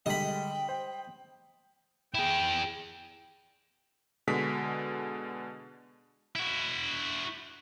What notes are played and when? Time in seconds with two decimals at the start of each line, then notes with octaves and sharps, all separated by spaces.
0.06 D3 G3 G#3 D#5 G5 B5
0.69 C5
2.15 E4 G#4 G5
4.27 B2 D3 G#3 B6
6.35 E4 F#4